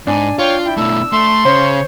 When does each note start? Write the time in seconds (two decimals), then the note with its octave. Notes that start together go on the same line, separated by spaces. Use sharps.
0.07 G#2 D4 G#5
0.39 F4 C#5 G5
0.64 E4 G5
0.77 B2 A3 E6
1.13 A3 C6
1.45 C#3 C5 C#5